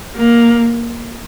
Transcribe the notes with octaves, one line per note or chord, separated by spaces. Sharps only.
A#3